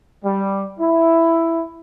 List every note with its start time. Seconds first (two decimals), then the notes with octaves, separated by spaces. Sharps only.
0.24 G3
0.79 E4